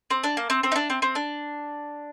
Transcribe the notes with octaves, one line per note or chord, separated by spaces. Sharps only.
C4
D4
A#3
C4
C4
D#4
D4
C4
C4
D4